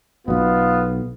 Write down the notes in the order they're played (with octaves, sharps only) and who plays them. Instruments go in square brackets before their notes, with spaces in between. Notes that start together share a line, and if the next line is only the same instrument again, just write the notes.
[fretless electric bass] B1 B2 [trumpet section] B3 F4